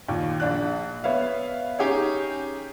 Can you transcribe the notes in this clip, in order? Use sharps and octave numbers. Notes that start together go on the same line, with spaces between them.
D#2 A#2
A#1 D4 F#6
B3 C#5 E5 F5
C#4 D#4 G4 G#4 C#5